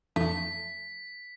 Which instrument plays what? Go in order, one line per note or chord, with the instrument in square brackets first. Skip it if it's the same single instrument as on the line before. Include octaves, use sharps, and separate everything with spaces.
[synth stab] F2 [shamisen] A3 [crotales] B6